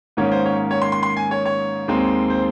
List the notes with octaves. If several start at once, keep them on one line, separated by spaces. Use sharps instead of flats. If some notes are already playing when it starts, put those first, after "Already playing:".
G#2 D#3 A#3 C#4 C#5
C5
C#5
C#5
C6
C6
C6
G#5
C#5
C#5
D#2 D#3 G#3 C4 D#4
C5